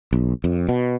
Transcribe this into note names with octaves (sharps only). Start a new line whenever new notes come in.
B1
F2
B2